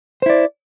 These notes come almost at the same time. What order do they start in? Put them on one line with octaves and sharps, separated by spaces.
C5 E4 D5